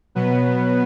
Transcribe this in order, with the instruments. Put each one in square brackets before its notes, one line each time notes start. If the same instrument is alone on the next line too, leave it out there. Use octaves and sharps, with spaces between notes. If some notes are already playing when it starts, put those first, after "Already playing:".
[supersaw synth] B2 F#3 B3 B4